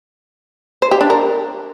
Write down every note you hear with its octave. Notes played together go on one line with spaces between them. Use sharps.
C5
G4
D4
A#4